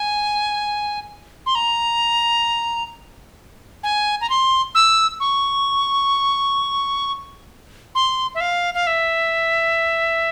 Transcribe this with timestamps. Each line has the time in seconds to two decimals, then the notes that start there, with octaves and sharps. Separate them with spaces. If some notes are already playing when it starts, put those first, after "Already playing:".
Already playing: G#5
1.46 C6
1.55 A#5
3.83 G#5
4.21 A#5
4.30 C6
4.75 E6
5.20 C#6
7.95 C6
8.35 E5
8.41 F5
8.74 F5
8.87 E5